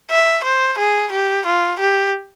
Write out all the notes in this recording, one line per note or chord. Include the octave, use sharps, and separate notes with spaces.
E5
C5
G#4
G4
F4
G4